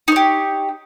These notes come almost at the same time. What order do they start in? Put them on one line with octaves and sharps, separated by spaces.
D#4 C#5 G4